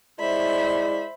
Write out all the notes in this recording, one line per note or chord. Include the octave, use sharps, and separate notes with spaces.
G#3 E4 C5 D5 E5 B5